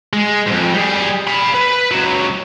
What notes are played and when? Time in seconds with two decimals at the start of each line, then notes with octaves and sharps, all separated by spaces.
0.13 G#3
0.47 F2 G#2
0.74 G3 G#4
1.27 F5 B5
1.54 B4
1.91 C#2 F#3